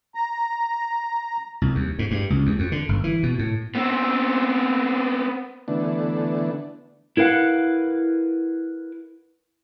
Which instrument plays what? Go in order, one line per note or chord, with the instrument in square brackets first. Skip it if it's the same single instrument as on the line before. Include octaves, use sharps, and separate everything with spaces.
[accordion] A#5
[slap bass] C2
D#2
G#2
G2
C#2
D#2
F2
D3
G1
E3
B2
A2
[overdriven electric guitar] B3 C4
[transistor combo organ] D3 E3 A3 B3 D4
[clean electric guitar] E4 A#4 B4 F5 F#5